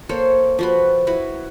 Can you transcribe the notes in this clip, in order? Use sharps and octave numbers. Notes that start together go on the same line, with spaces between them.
A#3 A4 C5 C#5
F3 F#4 B4
E4 F#4 B4